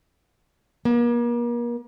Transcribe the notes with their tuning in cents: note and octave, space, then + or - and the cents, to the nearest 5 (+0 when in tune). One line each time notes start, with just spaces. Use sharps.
A#3 +40